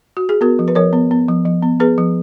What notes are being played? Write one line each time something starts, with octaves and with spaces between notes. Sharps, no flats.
F#4
G#4
B3 F#4 A#4
F3
B4
F3 A#4 C#5
B3
B3
F3
F3
B3
B3 G#4 B4
F3